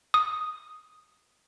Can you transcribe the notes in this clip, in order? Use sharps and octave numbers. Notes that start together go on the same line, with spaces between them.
D#6